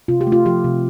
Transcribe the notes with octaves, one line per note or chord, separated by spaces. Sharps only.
C3 F4
G4
A3
F4
F3 G4
C3